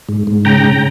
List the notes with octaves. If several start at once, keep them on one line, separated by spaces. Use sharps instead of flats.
G#2
G#2
C#3 G5 A#5
C#3